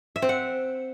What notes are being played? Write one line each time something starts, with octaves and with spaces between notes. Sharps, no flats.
E5
C4
F#5